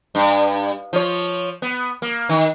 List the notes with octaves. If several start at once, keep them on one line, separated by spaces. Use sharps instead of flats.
G2
F3 C#5
B3
A#3
D#3